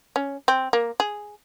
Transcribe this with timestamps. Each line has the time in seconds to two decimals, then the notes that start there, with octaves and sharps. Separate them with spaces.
0.16 C#4
0.48 C4
0.73 A#3
1.00 G#4